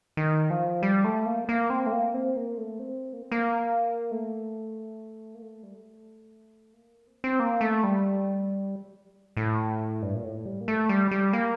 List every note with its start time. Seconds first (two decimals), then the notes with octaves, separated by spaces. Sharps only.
0.17 D#3
0.50 F3
0.83 G3
1.04 A3
1.26 A#3
1.49 A#3
1.70 C4
1.86 A3
1.92 A#3
2.14 C4
2.36 A#3
2.58 A3
2.79 C4
3.13 A#3
3.22 C4
3.32 A#3
4.11 A3
5.35 A#3
5.42 A3
5.63 G3
5.75 A3
6.74 A#3
7.07 C4
7.24 C4
7.40 A#3
7.61 A3
7.84 G3
9.37 A2
10.02 G2
10.15 A#2
10.24 A2
10.46 G3
10.61 A#3
10.68 A3
10.89 G3
11.11 G3
11.33 A#3